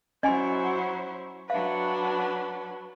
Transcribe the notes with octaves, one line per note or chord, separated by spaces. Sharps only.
F#3 C#4 E4 C5 D#5 G#5 C6
F#3 D4 B4 E5 F5